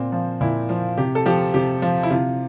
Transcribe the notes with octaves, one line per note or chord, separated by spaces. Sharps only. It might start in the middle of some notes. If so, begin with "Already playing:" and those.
Already playing: A#2 C4
F3
A#2 E4
F3 F4
C3 G4
A4
F3 G4
C3 G4
F3 F4
E4
C3 F4